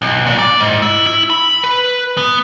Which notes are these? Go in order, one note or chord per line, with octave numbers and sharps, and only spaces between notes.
B1
A#2
D5
G#2
E4
E4
B5
B4
B3